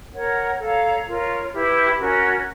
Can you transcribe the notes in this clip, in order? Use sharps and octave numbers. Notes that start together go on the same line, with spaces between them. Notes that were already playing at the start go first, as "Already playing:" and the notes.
A#4 C#5 F#5
A4 C#5 F5 A#5
F4 A#4 C#5
E4 G4 B4
C#4 F#4 A#4